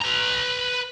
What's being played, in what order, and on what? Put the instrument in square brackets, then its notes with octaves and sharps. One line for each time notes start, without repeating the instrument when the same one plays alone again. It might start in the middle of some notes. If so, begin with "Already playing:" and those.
[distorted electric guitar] B4 A#5